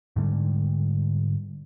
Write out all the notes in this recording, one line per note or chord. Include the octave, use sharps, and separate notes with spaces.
G#2 D3 G3 G#3